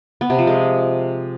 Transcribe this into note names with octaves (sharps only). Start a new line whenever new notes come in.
B3
C3
F3
G#3